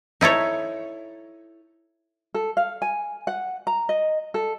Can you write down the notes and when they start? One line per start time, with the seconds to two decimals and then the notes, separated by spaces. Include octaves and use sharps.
0.21 D#4 E4 A4 C#5
2.34 A4
2.57 F5
2.82 G#5
3.27 F#5
3.67 A#5
3.89 D#5
4.34 A4